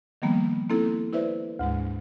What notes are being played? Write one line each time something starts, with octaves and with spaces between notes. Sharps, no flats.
D#3 F3 G3 A#3 B3
A#3 C4 D#4 E4 A4
E4 B4 C5 D5 E5
D2 G#2 G#3